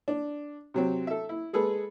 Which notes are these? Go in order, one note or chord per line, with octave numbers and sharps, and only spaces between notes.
D4
C3 F#3 C4
A4 E5
E4
G#3 G#4 A4 B4